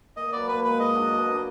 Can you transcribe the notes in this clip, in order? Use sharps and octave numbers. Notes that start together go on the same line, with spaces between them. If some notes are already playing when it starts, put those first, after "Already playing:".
A#2 D#5
F#3 B3 D5
A#2 B4
F3 G#3 B4
G#2 D#5
F#3 D4 F#4
B2
A#3
D4